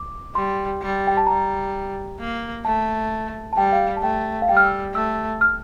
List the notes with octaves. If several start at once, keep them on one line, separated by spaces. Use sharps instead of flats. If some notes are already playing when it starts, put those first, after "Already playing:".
Already playing: D6
G3 C6
G3
G5
A5
G3 A#5
A#3
A3 A5
A5
G3 G5
F5
A5
A3 G5
F5
G3 G5
F6
E6
A3 E6
F6